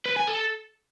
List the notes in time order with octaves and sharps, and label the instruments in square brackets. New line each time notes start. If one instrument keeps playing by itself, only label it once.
[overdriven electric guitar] B4
G#5
A4